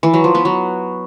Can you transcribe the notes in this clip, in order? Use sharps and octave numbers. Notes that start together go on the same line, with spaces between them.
E3
F#3
F3
B3
F#3